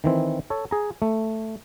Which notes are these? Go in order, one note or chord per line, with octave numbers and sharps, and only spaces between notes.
D#3 E3 C4
A4 C#5
G#4 A#5
A3